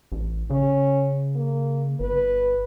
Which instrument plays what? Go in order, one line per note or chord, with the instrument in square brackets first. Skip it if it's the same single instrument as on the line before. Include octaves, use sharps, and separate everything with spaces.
[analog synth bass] A1
[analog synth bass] C#3 [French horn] C#4
[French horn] A#3
[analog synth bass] G1 [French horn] B4